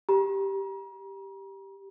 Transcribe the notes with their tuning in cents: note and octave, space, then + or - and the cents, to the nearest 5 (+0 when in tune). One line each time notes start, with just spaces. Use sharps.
G4 +0 A#5 +40